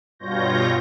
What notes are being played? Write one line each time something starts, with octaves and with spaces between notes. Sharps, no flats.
G2 B2 F4 C#5 G6 A#6